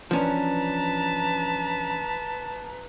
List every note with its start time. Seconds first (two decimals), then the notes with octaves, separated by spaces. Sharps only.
0.11 E3 F3 C#4 D4 B4 A5 A#5